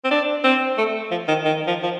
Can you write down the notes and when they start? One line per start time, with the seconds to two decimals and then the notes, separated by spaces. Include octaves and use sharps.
0.05 C4
0.11 D4
0.44 C4
0.78 A3
1.11 F3
1.28 D#3
1.45 D#3
1.67 F3
1.83 F3